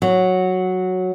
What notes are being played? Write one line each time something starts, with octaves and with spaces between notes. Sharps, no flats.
F#3